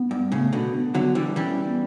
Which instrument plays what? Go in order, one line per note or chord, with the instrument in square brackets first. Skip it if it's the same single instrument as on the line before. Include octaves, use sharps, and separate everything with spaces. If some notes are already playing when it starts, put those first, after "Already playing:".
Already playing: [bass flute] B3
[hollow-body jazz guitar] G2
A2 C#3
B2 D3
[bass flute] B3
[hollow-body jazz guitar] D3 F#3
E3 G3
[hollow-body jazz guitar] E3 G3 [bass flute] C#4
[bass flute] B3